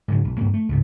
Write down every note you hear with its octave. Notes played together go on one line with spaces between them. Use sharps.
G#2 C#3 F#3
B1
G2 A#3
A3
C#2 G#2 C3